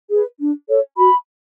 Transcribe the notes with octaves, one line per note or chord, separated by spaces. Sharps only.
G#4 B4
D4
A4 C#5
F#4 B5